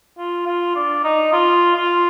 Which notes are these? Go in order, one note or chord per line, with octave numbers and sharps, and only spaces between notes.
F4
F4
D4
D#4
F4
F4